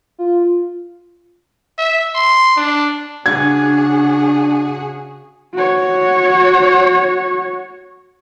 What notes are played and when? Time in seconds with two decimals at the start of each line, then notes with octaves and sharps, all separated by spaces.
0.18 F4
1.78 E5
2.15 C6
2.57 D4
3.26 C#3 D4 F#4 G#4 G#6
5.54 F#4 C#5